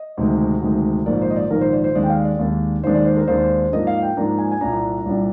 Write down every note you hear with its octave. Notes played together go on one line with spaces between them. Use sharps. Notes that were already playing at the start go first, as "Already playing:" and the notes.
Already playing: D#5
D2 C3 D#3 G#3
D2 C3 D#3 G#3
A#1 G#2 D#3 A#3 D5
C5
D#5
D5
A#1 G#2 D#3 A#3 A#4
C5
D5
C5
D#2 D#3 G#3 D4 D5
G5
F5
D5
D#2 D#3 G#3 D4
D#2 D#3 G#3 D4 C5
D5
C5
A#4
D#2 D#3 G#3 D4 C5
G#2 F3 A#3 D4 D#5
F5
G5
G#2 F3 A#3 D4 A#5
G#5
G#5
C2 A#2 G3 D4 A#5
C2 A#2 G3 D4